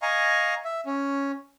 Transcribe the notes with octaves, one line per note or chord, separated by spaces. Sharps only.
D#5 F5 G#5 A#5 C#6
E5
C#4